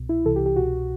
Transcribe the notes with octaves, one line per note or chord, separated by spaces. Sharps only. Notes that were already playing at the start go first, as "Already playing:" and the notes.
Already playing: C2 B2
E4
C2 C3 E3 A4
G4
G4
C2 B2 F#4